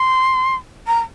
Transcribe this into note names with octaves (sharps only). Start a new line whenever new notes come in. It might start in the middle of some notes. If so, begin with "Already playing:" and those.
Already playing: C6
A#5